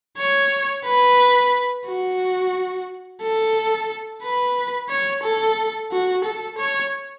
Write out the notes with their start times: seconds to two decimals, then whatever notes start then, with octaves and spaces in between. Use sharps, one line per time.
0.18 C#5
0.86 B4
1.87 F#4
3.22 A4
4.23 B4
4.90 C#5
5.23 A4
5.92 F#4
6.24 A4
6.58 C#5